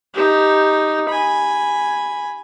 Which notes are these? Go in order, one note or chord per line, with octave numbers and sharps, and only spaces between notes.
D#4 G4
G#5 B5